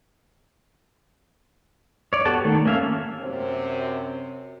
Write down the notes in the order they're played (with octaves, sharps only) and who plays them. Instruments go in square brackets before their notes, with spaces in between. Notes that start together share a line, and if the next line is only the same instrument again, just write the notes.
[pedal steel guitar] C#5 D5
B3 F#4 G4 A4 A5
D#3 A3
A#3 C#4 E5 F5
[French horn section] F#2 C3 C4